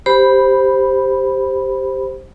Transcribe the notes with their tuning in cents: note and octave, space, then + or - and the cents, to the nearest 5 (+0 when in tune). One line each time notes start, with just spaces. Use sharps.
G4 +0 C5 +0 B5 -5